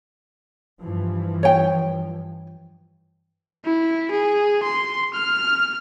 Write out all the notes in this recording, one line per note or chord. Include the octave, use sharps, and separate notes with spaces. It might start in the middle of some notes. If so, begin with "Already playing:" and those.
G2 E3 F3
C#5 G5
E4
G#4
C6
F6